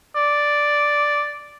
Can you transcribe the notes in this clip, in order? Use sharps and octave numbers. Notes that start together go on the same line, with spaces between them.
D5